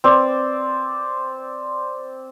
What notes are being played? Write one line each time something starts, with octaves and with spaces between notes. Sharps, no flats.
C4 D5